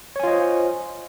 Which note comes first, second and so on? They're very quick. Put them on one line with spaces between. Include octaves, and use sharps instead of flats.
C#5 G#5 F4 D#5 C5